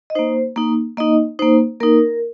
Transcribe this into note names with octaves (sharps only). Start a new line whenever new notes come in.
D#5
A#3 D#4 C5
A#3 D#4
A#3 D#4 D#5
A#3 D#4 C5
A#3 D#4 A#4